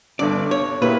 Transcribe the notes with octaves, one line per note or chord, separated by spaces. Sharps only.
G1 G2 D3 D5
C#5
A#2 A#3 E4 G4 B4